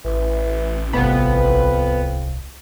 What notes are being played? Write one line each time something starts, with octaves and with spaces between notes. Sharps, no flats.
A1 E3
D1 C2 F2 B3